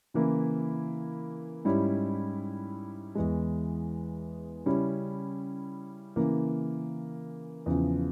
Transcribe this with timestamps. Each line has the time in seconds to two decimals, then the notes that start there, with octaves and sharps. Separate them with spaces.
0.14 C#3 E3 A#3 E4
1.65 G#2 G3 C#4 E4
3.15 E2 E3 G#3
4.66 C#3 G3 C#4 E4
6.16 C#3 E3 A#3
7.66 E2 C#3 F3